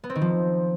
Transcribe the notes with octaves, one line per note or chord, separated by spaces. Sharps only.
B3
C4
D#3
F3